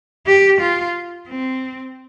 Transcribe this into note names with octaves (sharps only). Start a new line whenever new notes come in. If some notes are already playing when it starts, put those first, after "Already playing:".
G4
F4
C4